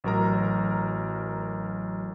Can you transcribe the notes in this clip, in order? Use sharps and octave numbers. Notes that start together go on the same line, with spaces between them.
A1 F#3 A#4 A#5